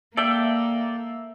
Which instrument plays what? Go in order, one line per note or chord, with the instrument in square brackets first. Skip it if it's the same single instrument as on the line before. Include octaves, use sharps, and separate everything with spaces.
[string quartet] A#3 [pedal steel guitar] A4 D5 G5 [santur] E5